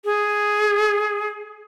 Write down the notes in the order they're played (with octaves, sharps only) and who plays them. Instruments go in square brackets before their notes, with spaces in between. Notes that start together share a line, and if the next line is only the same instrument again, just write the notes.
[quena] G#4